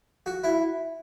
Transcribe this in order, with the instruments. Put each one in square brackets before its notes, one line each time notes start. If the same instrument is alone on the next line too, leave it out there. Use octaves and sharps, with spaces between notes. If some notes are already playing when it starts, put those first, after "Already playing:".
[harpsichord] F#4
E4